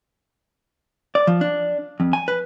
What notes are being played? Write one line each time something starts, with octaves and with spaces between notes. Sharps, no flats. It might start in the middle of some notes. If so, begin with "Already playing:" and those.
D5
F3
D4
F2
G#5
B4